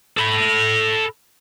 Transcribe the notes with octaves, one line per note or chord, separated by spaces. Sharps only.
A4 B5